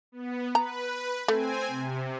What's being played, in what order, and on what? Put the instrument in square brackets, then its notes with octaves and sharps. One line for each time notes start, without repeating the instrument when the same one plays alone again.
[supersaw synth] B3
[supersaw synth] B4 [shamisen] A#5
[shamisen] A3 [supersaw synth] C4 G#5
[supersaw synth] C3